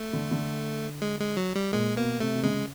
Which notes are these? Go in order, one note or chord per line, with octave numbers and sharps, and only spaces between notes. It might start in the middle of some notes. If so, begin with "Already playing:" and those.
Already playing: A3
D3
D3
G#3
G#3
F#3
G3
A#2 G#3
B2 A#3
C3 A3
C3
C#3 G#3